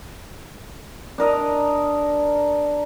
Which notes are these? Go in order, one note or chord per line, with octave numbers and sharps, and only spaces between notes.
D4 A#4 D#5